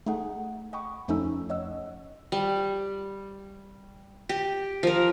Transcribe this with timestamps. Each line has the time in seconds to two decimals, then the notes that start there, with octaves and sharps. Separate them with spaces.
0.06 A3 D#4 G#4 F#5
0.73 D#5 F#5 G5 B5 C#6 D6
1.08 F2 F3 A3 C#4 D#4 E6
1.49 F2 C#5 D#5 F#5 E6
2.32 G3
4.29 G4
4.83 F3 A#4